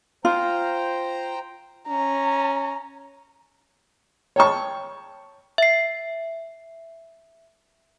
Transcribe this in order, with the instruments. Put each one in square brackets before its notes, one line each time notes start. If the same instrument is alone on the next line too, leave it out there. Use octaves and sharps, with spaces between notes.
[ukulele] F4 [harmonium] C5 G5 A#5
[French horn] C#4 [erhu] A#5
[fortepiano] C#5 G5 A5 C#6
[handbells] E5 C7